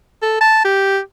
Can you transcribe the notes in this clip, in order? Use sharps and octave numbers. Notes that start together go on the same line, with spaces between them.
A4
A5
G4